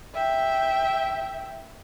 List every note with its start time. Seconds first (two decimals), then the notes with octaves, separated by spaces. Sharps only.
0.15 E5 G5